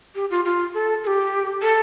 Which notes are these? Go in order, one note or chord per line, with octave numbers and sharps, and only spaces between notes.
G4
F4
F4
A4
A4
G4
A4